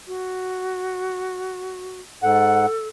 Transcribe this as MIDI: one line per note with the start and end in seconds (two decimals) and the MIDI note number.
0.08 2.01 66
2.23 2.66 44
2.23 2.88 69
2.23 2.66 78